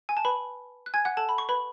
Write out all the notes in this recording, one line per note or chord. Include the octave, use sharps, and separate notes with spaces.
G#5
A5
B4 B5
F#6
G#5 G#6
F#5 F#6
A4 A5
B5
C#6
B4 B5